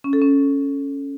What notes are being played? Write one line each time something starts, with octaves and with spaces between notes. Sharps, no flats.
C#4
A4
C#4